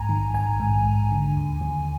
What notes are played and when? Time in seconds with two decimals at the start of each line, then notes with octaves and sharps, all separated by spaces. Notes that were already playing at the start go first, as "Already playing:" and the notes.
Already playing: A#1 G#2 G#5 A#5
0.09 D#3
0.34 A#1 G#5
0.60 G#2
0.85 A#1
1.11 D3
1.37 D#2
1.61 D#2